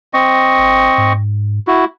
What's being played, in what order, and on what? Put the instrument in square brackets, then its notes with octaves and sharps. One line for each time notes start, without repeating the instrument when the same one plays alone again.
[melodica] C4 D#5 C#6
[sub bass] G#1
G#2
[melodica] E4 F#4